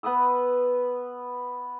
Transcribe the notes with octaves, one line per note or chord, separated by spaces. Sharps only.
B3 B4 D#6 E6